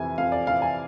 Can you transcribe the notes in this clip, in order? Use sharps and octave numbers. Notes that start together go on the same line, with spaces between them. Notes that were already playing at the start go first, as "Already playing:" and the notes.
Already playing: F2 C3 E3 G#5
F2 F5
D5
C3 E3 F5
G#5